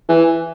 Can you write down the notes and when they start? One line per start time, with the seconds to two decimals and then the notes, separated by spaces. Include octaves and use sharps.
0.09 E3